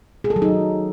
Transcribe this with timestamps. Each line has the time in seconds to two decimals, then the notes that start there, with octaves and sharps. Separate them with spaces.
0.24 G#4
0.30 A4
0.36 F#3
0.42 D#4